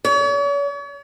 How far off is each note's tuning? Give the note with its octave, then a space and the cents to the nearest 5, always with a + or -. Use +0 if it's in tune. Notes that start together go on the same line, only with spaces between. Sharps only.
C#5 +45